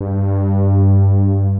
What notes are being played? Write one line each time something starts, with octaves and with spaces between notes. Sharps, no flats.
G2